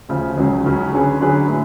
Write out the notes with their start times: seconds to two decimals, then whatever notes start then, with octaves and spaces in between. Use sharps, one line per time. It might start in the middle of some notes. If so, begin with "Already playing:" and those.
0.09 D2 C#3 F3
0.37 C#2 C#3 F#3 C#4
0.65 C#2 C#3 F#3 C#4
0.93 D3 F#3 C#4 G#4 B4
1.21 D3 F#3 C#4 G#4 B4
1.49 A2